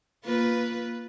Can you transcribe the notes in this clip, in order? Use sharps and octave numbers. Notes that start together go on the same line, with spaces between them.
A#3 F4 B4